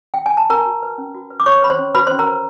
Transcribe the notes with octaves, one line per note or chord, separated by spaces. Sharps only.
G5
G#5
A5
A#4 B4 A#5
F#4
B4
C#4
F#4
B4
D6
B4 C#5 C#6
B4 B5
C5 C6
C#4
F#4 B4 B5
C5 C6
C#4
A#4 A#5
B4